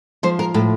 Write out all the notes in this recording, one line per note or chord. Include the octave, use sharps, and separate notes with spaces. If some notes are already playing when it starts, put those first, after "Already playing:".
F3 C5
A#4
A2 A4